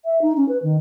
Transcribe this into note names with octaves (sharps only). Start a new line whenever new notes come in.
E5
D#4
C#4
B4
D#3